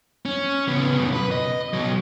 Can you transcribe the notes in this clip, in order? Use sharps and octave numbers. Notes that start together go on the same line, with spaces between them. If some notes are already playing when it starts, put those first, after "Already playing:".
C#4
C#3 B3
F#2 B2
B4
D#5
B2 F#3